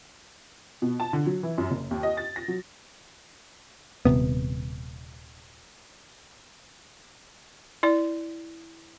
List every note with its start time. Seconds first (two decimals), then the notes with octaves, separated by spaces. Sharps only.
0.82 B2
1.00 A5
1.13 D3
1.26 F#3
1.43 E3
1.58 F#2
1.71 F#1
1.91 D#2
2.03 D#5
2.17 A6
2.36 A#6
2.48 F#3
4.05 D#1 G#2 C3 B3
7.83 E4 D5